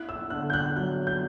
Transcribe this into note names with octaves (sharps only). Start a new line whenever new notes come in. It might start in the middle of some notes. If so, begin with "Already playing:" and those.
Already playing: E4 F#6
E6
D3 F#6
G6
F#6
F#3 F#6
G6